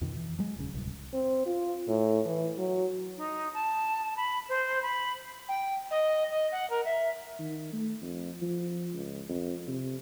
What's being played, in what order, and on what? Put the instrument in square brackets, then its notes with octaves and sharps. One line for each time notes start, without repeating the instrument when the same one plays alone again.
[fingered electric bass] F2 B2 D#3
E3
F#3 G#3
D#1 C#3
D1 C2
[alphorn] C4
F4
A2
E3
F#3
[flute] D#4
A5
B5
C5
B5
[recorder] G5
D#5
D#5
F#5
A#4
E5
[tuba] D#3
A3
F2
F3
C#2
F2
C3